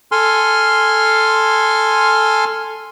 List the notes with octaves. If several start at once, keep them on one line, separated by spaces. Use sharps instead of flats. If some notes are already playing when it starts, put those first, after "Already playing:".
A4 G#5 C6 F6